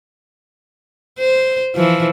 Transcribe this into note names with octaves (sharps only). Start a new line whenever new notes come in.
C5
E3 F3